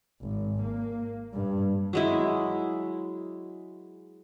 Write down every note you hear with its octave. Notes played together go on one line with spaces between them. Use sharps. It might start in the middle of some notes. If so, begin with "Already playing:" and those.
G#1
A#3
G2
F#3 G#3 E4